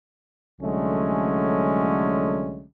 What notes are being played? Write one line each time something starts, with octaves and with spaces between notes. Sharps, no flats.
C2 D3 F#3 G#3 A3 C#4